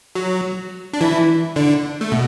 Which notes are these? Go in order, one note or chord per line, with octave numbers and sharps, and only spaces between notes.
F#3
D4
E3 E4
D3 D4
A3
B2